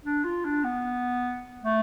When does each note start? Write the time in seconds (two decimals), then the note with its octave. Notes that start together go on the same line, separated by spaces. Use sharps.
0.04 D4
0.24 F4
0.45 D4
0.64 B3
1.63 A3